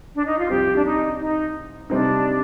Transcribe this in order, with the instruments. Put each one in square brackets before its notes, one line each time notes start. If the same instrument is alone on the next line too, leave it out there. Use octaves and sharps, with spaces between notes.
[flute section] D4
D#4
F4
[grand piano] C2 C3 F3 C4 [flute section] G4
[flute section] D4
D#4
D#4
[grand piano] C3 G3 C4 D#4 [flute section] D4